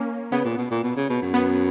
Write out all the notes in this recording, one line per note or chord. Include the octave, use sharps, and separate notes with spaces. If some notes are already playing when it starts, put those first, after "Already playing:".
Already playing: A#3 C#4
C#3 B3
A#2
B2
A#2
B2
C#3
B2
F#2
B3